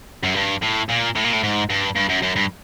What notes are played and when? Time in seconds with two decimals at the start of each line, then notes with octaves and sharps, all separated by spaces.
0.24 F#2
0.36 G2
0.63 A2
0.90 A#2
1.16 A2
1.25 A#2
1.33 A2
1.43 G#2
1.70 G2
1.96 G2
2.09 F#2
2.22 F#2
2.36 G2